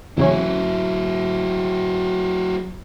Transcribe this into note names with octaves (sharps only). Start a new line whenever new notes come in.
E2 C#3 F#3 C#4 E4